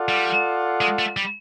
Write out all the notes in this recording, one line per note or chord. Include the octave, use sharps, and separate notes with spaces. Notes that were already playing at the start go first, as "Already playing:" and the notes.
Already playing: F4 A4 D5 F#5
G3
G#3
A3
G3